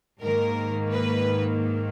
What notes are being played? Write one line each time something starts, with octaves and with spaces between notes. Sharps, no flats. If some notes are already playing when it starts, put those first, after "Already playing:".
G#2 D#3 A#3 A#4
B4